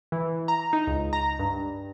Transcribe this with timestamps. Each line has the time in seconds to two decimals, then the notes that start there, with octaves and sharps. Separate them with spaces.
0.12 E3
0.48 A#5
0.73 D#4
0.87 C#2
1.13 A#5
1.39 G2